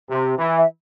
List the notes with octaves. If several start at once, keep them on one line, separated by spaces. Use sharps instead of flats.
C3
E3
E5